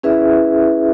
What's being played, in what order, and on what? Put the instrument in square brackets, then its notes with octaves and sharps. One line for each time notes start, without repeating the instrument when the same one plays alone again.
[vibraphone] C#4 E4 G#4 B4 E5